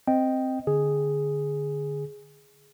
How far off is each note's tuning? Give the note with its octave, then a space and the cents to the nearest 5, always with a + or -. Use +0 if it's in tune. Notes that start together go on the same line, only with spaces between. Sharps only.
C4 +0 D#5 +0 G5 +0
D3 +0 G#4 +0